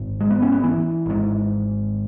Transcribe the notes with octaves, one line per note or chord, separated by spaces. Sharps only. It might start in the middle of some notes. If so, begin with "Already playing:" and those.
Already playing: G#1 G#2
G#3
B3
C#4
B3
E3
G#1 G#2